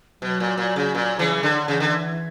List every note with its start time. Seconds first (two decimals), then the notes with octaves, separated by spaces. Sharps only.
0.22 B2 F#3
0.40 A#2
0.58 A#2
0.76 C#3
0.95 A#2
1.19 C#3 E3
1.43 D3
1.68 C#3 E3
1.80 D3